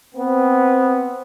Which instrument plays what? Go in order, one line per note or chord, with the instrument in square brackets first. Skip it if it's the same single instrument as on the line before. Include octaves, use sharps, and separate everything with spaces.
[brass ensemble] B3 C4